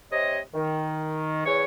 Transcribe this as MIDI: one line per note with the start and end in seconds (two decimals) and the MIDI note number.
0.11 0.38 48
0.11 0.38 73
0.11 0.38 75
0.54 1.44 51
1.46 1.64 40
1.46 1.64 73